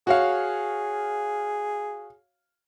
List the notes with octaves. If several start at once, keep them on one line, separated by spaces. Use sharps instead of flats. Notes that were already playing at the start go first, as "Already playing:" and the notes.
F#4 G#4 C#5 F5